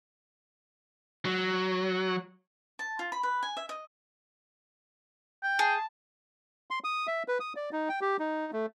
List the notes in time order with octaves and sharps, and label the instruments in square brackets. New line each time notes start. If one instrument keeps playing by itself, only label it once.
[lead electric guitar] F#3
[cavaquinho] A5
F4
B5
B4
G#5
E5
D#5
[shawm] G5
[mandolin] G#4 [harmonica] A5
[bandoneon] C6
D#6
E5
B4
D#6
D5
D#4
G5
G4
D#4
A3